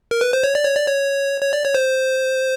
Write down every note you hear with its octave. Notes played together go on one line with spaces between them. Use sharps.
A#4
B4
C5
C#5
D5
C#5
D5
C#5
C#5
D5
C#5
C5